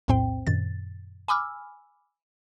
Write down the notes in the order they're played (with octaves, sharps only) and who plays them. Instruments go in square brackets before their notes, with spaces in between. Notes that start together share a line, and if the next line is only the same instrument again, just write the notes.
[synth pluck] B1 E2 A2 C4 C5 G5
F#2 A#2 D#3 A6
G#5 B5 D6 E6 F6